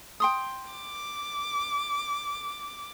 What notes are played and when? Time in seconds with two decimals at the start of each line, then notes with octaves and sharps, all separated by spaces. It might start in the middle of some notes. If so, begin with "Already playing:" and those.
0.20 G5 C6 D#6
0.71 D6